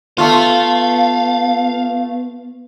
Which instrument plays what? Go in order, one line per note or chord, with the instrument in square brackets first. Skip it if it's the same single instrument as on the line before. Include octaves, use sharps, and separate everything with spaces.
[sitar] A3 F4 [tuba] B3 [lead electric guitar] F5